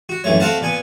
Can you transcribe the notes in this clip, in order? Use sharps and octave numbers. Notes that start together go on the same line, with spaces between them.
F#4
A#1 F#2 E3 A3 C#5
A3 C4 F#4 F5 F#5 A5
A#2 B3 G#5